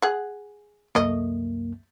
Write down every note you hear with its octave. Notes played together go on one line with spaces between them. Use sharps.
G#4 F#5
C2 F#2 A3 A#3 D#5